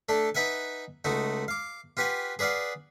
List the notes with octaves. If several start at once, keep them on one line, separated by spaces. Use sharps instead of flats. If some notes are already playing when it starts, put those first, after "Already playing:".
A3 D4 A4
D#4 B4 E5 F#5 G#5
C#2 A3 D#4 F#4
F5 D6
F4 G4 B4 F#5 G#5
G#4 B4 D5 F5 F#5